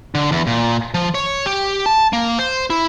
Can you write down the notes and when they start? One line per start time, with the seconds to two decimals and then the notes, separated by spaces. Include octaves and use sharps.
0.15 D3
0.32 E2
0.47 A#2
0.94 F3
1.15 C#5
1.46 G4
1.86 A5
2.13 A#3
2.39 C5
2.70 E4